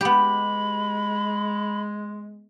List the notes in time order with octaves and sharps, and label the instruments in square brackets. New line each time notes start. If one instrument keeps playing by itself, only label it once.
[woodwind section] G#3 [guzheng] B3 G4 [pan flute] B5